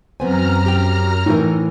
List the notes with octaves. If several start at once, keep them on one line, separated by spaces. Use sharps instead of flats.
F#2 E3 B3 C4 G#5 A#5 F6
G4 G5
A2 E3 D#4 A#4